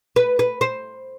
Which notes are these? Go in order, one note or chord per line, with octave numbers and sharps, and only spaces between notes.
B4
B4
C5